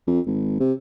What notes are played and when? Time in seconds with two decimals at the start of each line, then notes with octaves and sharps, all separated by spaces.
0.07 F2
0.26 G#1
0.60 C3